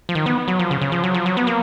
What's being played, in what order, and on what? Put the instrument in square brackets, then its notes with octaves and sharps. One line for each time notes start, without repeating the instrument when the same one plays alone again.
[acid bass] F3
D#3
B3
F#3
F3
C#3
C#3
F3
F#3
F3
F#3
B3
A#3